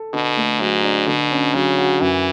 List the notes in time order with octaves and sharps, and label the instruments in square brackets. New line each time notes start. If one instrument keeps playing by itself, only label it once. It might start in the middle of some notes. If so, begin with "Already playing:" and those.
Already playing: [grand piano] A4
[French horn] B2 [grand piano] D3
[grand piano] A3
[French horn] G#2 [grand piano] F#3
[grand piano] D4
[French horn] B2 [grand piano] D3
[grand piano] C#4
[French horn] C#3 [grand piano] F#3
[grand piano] F#4
[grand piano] F#2 [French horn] E3